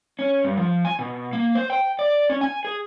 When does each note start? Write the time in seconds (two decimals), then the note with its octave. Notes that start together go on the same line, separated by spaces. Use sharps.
0.19 C#4
0.44 G2
0.57 F3
0.85 G#5
0.99 B2
1.33 A#3
1.55 C5
1.70 G5
1.99 D5
2.30 C#4
2.41 G#5
2.65 G#4